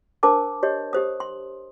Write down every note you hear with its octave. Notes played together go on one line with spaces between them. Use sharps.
D4 A#4 C5 A5 D6
G4 C#5 D#5
G4 C5 D#6
C6